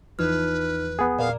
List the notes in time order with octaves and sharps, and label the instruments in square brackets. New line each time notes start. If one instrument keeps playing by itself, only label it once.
[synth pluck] E2 E3 F3 [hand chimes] D#4 F6 [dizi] B4
[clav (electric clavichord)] B3 G#4
[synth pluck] A#2 A#4 [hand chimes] D5 [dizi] F5